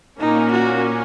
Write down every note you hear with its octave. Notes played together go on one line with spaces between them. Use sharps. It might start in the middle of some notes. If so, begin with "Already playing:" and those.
A#2 A#3 C#4 D#4
F#4